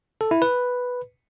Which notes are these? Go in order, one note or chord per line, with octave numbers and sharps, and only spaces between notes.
A4
E4
B4